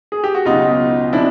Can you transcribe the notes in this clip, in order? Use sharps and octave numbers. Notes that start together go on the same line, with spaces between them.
G#4
G4
F#4
C#2 B2 F#3 D#4 F4
C3 F3 D4 E4